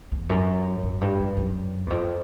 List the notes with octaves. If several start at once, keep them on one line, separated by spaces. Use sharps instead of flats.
E2
F#2
F#2
G2
G2
F#2
E2
F2